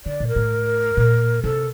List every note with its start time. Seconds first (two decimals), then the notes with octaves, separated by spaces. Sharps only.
0.05 D3 D5
0.20 A#2
0.28 A#4
0.36 A2
0.97 A#2
1.44 C3 A4